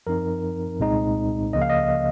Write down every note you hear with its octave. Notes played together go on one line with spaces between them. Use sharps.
F#2 F3 C4 D#4 A#4
C2 A#2 G#3 C4 D#4
C#2 C#3 F3 A#3 D#5
F5
D#5